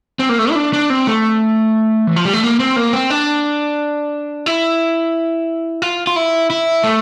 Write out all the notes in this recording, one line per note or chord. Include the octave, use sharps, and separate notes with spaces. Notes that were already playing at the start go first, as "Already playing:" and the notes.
C4
A#3
A3
E4
D4
D4
C4
A3
E3
F3
G3
A3
A#3
C4
A#3
C4
D4
E4
F4
F4
E4
E4
A3